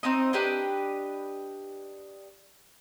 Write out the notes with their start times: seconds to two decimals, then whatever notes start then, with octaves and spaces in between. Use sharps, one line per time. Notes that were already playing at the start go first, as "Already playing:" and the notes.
0.03 C4 D#4 D#5
0.33 D4 G4 B4 D#5